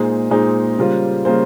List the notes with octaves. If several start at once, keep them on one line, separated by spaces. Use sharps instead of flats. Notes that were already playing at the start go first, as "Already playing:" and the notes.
Already playing: A#2 G#3 D#4 G#4 C5
A#2 G#3 D#4 G#4 C5
C#3 G3 A#3 F4 C5
C#3 G3 A#3 F4 C5